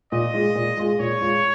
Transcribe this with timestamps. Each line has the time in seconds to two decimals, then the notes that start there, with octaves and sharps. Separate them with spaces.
0.12 A#2 D#5
0.34 G#3 F4 G#4
0.56 A#2
0.77 G#3 F4 G#4
0.99 A#2 C#5
1.20 G#3 F4 G#4